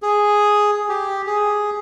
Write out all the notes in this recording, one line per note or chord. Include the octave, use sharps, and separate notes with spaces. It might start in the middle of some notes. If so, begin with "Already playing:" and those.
G#4
G4
G#4